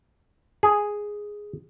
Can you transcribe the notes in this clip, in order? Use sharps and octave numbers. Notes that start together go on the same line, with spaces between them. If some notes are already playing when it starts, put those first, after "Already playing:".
G#4